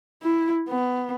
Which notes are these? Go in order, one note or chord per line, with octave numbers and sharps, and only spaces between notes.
E4
B3